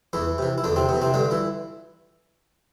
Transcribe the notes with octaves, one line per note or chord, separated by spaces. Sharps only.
E2 E3 E4
C3 E3
E4
E2 D3 D4
C3 C4
C3 E3 B3
C3 C4
G2 D3 D4
E3 E4